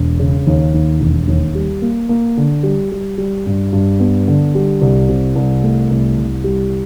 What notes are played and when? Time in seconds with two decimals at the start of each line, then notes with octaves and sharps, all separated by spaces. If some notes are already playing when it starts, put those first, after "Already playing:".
Already playing: E1
0.19 C#3
0.47 D#2
0.74 D#2
1.00 E1
1.27 D#2
1.55 G3
1.82 A#3
2.09 A#3
2.37 D3
2.63 G3
2.92 G3
3.18 G3
3.46 G2
3.73 G2
4.00 B3
4.28 D3
4.55 G3
4.81 C2
5.09 C3
5.35 C2
5.63 A3
5.91 C2
6.18 C2
6.44 G3